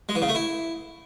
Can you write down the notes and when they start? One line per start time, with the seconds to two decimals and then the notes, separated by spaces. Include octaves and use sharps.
0.09 G#3
0.15 E3
0.22 C#3
0.28 A3
0.35 E4